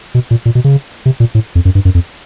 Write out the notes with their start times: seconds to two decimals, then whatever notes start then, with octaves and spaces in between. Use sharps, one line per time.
0.15 B2
0.31 A#2
0.45 A#2
0.55 B2
0.64 C#3
1.06 C3
1.20 A#2
1.35 A2
1.55 F2
1.65 F#2
1.75 G2
1.85 F#2
1.95 F2